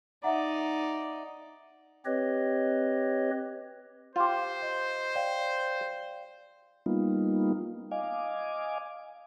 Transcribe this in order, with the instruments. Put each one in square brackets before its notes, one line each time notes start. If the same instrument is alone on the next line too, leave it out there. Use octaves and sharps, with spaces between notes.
[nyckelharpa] D#4 D5 [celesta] E5 F#5 A#5
[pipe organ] C4 G4 B4 C#5 D#5
[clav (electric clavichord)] F4 G4 [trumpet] C5
[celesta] D#5
D5 F5 G5
[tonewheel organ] G3 A#3 B3 D#4 F4
D#5 F5 G#5 D6